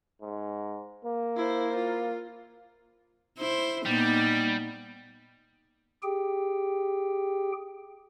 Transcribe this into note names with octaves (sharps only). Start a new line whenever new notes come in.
G#2
A#3
E4 C5
F4
E4 C5
A#2 G3 B3 D#4
G4 G#4 G5